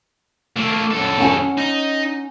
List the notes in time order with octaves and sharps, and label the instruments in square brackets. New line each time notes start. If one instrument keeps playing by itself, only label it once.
[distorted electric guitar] A3 A#3
F#2 A4
[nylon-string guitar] C#4 F#5 G#5
[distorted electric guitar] D#4